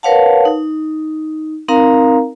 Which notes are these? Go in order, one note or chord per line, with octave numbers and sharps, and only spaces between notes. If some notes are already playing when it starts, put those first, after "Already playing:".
A#4 B4 C#5 F5 F#5 A5
D#4
C4 D#4 A#4 F5 A#5